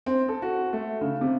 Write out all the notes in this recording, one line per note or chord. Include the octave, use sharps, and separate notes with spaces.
C4
A4
F#4
A3
C#3
C3